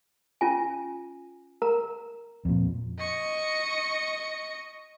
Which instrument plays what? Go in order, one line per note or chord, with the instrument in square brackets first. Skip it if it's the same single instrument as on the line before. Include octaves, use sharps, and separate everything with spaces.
[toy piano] C#4 F4 G#5
A#4 A#5
[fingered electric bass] F2 A#2
[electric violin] D#5 C#6